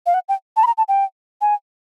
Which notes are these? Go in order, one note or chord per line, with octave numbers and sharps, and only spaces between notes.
F5
F#5
G5
A5
B5
A#5
A5
G5
G#5